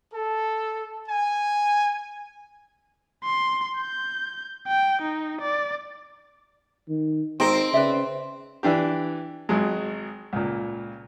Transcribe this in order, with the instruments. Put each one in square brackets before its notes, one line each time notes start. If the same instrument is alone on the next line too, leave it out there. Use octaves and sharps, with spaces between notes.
[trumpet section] A4
G#5
[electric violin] C6
G6
G5
D#4
D5
[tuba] D#3
[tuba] G#1 [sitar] C4 [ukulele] D#4 A#4 C5
[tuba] C#3 [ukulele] B4 D5 E5
[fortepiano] E3 D4 G4
G#1 F#3 G#3
C#2 A#2